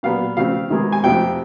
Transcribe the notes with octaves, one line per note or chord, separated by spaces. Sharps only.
A#2 F#3 B3 F5
C#3 F3 A3 C4 F5
C3 D#3 G#3 B3
G#5
F2 C3 F3 A3 C4 G5